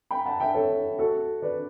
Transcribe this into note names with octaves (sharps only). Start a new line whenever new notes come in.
G5 B5
F#5 A5
E5 G5
A4 C#5
F#4 A4
B4 D5